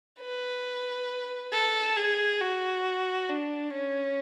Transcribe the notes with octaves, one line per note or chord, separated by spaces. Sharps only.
B4
A4
G#4
F#4
D4
C#4